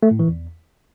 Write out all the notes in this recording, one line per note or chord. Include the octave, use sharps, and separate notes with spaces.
A3
A2
E3
E2